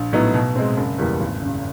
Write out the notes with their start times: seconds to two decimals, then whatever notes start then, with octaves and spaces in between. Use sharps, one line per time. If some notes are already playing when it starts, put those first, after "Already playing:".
Already playing: A#1
0.13 A2 F#3 B3 D#4
0.34 B2
0.56 G#3 C4
0.77 F#1
0.98 E2 B2 G3 A#3
1.20 G#1
1.42 F#2 C#3